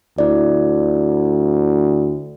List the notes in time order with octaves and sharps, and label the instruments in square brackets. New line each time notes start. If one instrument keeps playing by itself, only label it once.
[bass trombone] D2 [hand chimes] E4 D5